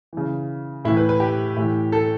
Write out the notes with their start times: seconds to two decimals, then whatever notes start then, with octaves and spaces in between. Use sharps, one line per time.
0.13 C#3 E3
0.85 A2 E3 E4
0.97 B4
1.09 B4
1.20 G4
1.56 A2 E3
1.92 A4